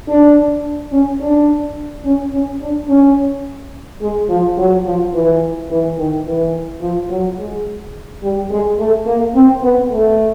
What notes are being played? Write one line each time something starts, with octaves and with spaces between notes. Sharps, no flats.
D4
C#4
D4
C#4
C#4
D4
C#4
G#3
F3
F#3
F3
E3
E3
D#3
E3
F3
F#3
G#3
G3
G#3
A3
A#3
C4
B3
A3